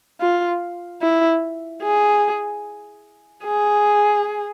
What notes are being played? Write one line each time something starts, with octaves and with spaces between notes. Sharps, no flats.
F4
E4
G#4
G#4